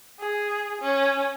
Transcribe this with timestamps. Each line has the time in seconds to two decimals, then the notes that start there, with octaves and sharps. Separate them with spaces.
0.19 G#4
0.81 C#4